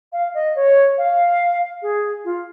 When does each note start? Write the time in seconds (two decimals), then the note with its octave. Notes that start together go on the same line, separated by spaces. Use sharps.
0.13 F5
0.34 D#5
0.56 C#5
0.98 F5
1.82 G#4
2.25 F4